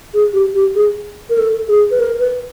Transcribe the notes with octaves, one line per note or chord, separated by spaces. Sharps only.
G#4
G4
G4
G#4
A#4
A4
G#4
B4
A#4
B4